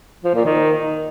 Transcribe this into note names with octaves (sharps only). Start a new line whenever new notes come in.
F3
A#2
D#3